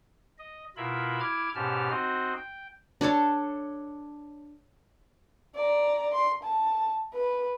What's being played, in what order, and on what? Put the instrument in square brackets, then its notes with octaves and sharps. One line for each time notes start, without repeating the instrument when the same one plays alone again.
[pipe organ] D#5
B2 E4 F4 A#4 E5 B5
E4 D6 F6 G#6
G#2 B2 C#4 G4 A5 F6
C4 D#4 F#4 C5 D#5
G5
[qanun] D4 A4 C#5 A5
[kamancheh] D5 A#5
C6
A5
B4